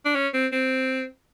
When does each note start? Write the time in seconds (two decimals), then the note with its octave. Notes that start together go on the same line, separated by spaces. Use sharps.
0.05 D4
0.15 C#4
0.34 C4
0.52 C4